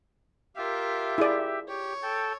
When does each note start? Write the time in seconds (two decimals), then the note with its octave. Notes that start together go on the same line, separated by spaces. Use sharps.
0.56 F4 G4 A#4 E5
1.18 E4 G#4 D5
1.68 G4 C#5
2.03 A4 G5 A5